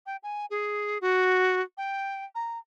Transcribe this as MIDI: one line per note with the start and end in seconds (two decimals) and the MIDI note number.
0.06 0.16 79
0.23 0.46 80
0.51 0.98 68
1.01 1.61 66
1.78 2.25 79
2.35 2.58 82